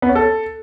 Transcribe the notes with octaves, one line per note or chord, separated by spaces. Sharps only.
B3
C#4
A4